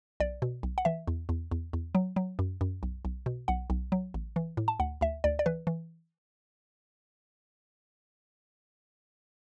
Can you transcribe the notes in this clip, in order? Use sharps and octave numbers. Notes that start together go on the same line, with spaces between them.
B1 D5
B2
B1
F#5
E3 E5
E2
E2
E2
E2
F#3
F#3
F#2
F#2
B1
B1
B2
B1 F#5
B1
F#3
A1
E3
A2
A5
D2 F#5
D2 E5
D2 D5
D5
E3 B4
E3